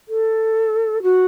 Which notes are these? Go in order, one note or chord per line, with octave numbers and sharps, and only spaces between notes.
A4
F#4